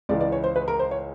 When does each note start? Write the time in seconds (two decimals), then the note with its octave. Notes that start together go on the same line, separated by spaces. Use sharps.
0.09 C#2 C#3 E3 G#3 D5
0.20 D5
0.32 C#5
0.44 C5
0.56 B4
0.68 A#4
0.79 C5
0.91 C#5